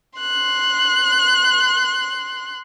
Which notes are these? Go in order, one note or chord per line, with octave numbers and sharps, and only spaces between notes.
C6 F#6